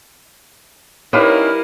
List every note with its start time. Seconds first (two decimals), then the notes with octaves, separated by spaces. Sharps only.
1.13 G3 C#4 D#4 E4 A#4 B4 F5